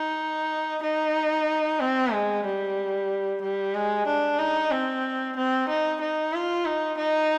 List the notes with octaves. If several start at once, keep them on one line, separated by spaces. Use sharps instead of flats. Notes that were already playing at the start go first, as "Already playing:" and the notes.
Already playing: D#4
D#4
C4
G#3
G3
G3
G#3
D4
D#4
C4
C4
D#4
D#4
F4
D#4
D#4